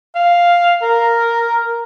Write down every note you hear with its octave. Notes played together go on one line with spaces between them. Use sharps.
F5
A#4